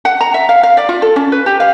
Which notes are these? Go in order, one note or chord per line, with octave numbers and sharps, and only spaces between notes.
F#5
A#5
E5
F5
F5
D5
F4
A4
C#4
B4
G4
F5